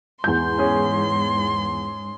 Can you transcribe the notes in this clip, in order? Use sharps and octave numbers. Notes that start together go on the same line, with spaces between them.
E2 G#2 C6 G6
C#4 G#4